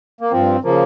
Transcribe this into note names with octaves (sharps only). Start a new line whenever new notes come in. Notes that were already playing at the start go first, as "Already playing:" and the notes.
A#3
G2 F3 C4
C#3 F3 A#3